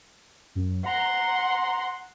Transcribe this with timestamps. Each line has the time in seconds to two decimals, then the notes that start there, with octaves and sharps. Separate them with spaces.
0.55 F#2
0.86 F#5 A#5 C6